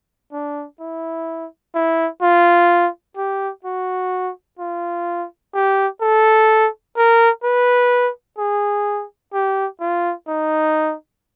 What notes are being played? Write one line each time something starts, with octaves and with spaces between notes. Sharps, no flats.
D4
E4
E4
F4
G4
F#4
F4
G4
A4
A#4
B4
G#4
G4
F4
D#4